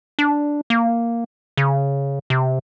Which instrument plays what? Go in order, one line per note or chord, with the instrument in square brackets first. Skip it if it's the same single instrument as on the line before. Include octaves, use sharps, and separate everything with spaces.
[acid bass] D4
A#3
C#3
C3